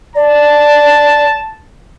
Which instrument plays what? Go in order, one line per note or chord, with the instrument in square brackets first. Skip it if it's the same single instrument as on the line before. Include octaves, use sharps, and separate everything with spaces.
[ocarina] D5 [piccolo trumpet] A5